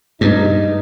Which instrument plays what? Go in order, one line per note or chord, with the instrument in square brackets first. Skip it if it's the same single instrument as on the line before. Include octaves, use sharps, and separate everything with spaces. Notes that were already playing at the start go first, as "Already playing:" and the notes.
[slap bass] G2 [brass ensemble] D#4